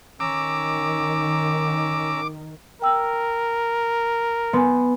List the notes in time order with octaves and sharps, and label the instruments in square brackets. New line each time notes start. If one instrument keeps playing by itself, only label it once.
[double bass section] D#3 [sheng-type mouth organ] C#4 A#5 E6 [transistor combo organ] D6
[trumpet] A#4 [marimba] G5 E6
[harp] B3 [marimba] G#5 C6